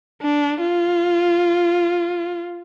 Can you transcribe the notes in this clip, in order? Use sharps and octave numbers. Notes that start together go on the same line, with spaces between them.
D4
F4